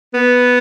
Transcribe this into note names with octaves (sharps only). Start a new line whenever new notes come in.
B3